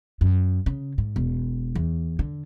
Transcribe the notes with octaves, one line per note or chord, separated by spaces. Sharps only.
F#2
C#3
G#2
E1
E2
D3